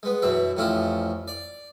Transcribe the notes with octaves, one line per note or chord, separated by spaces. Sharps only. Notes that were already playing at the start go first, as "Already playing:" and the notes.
G#3 B3
F#2 B2 E3 E5
A1 F2 C#4 E4 F4
D5